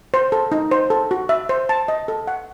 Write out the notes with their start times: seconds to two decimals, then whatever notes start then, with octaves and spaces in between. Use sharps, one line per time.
0.14 C5
0.32 A4
0.52 D#4
0.71 C5
0.90 A4
1.11 F#4
1.29 E5
1.49 C5
1.69 A5
1.88 D#5
2.08 A4
2.27 F#5